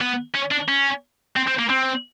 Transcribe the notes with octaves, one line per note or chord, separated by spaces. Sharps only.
B3
C#4
D4
C#4
C4
C4
A#3
C4